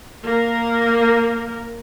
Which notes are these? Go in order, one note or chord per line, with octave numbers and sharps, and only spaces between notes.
A#3 A#4